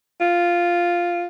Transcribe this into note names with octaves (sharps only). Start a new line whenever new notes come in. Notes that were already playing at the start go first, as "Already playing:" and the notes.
F4